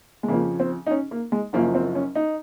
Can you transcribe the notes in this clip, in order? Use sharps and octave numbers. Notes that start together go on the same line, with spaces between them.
G#3
F2 C#3 F3 A#3
C4
D#4
C#4
A#3
G#3
F#1 F#2 F3 A#3
C4
C#4
D#4